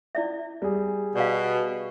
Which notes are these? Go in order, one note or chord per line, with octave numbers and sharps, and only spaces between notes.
E4 D5 E5
G3 G#4
B2 D5 F5